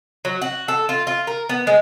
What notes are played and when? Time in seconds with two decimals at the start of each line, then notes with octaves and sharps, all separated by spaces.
0.25 F#3
0.42 F#4
0.68 A4
0.89 F4
1.07 F4
1.27 A#4
1.49 B3
1.67 G#3